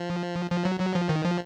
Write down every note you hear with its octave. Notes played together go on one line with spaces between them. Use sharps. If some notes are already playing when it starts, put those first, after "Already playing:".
Already playing: F3
F3
F#3
F#3
F3
D#3
F3